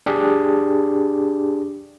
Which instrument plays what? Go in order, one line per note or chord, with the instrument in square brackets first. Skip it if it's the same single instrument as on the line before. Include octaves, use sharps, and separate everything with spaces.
[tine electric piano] D4 G4 G#4